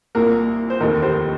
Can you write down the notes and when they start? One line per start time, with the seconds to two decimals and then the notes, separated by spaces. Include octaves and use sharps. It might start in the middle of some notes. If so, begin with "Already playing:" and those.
0.15 C2 A#2 A#3 A#4
0.70 C5
0.80 F1 D#2 D#3 A#4
1.02 G4 C5